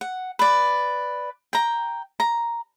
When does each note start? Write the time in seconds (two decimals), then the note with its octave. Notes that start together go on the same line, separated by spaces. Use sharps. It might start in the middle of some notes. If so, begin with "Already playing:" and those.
0.01 F#5
0.39 B4 D5
1.53 G5 A#5
2.20 A#5